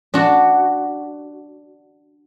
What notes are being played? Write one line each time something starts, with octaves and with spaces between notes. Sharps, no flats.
D4 F#4